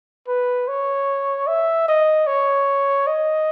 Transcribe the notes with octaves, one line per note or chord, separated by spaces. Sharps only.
B4
C#5
E5
D#5
C#5
D#5